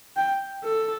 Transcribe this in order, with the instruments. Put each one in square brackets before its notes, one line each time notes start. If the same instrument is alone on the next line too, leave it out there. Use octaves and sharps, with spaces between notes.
[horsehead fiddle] G5
A4